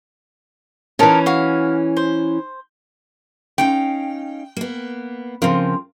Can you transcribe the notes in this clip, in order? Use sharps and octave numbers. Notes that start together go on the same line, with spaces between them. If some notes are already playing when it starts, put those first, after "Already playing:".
E3 C#4 D#4 A#4 A5
F#4 F5
C5
C#4 D#4 F5 G5
A#3 B3
C#3 F3 C4 F4 A#4